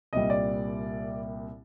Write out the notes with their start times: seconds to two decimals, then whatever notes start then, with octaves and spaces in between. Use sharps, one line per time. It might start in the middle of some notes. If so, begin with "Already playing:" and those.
0.13 C2 A#2 G3 D#5
0.30 D5